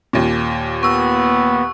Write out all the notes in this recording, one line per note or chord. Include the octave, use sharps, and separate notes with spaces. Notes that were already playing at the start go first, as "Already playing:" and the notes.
D#2 A#2
B3 C#6 E6